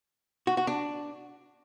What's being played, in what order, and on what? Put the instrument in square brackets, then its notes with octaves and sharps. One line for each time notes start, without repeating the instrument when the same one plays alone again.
[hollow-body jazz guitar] F#4
F#4
D4